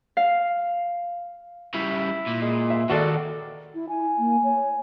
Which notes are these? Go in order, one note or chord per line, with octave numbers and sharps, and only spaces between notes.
F5
C#3 G3 E4
A#2
G#3
E5
D#2 G#3 F#4 A4 D5
E4
E4 G#5
A#3
C#5